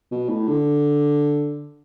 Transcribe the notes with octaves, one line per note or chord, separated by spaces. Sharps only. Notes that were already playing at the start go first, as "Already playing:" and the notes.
B2
A2
D3